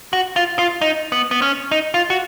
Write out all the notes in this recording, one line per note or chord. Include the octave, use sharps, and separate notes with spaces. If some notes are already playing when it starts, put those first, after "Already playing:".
F#4
F4
F4
D#4
B3
B3
C#4
D#4
F4
F#4